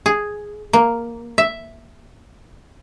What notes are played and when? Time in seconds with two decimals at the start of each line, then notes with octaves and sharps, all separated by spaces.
0.06 G#4
0.73 A#3
1.38 E5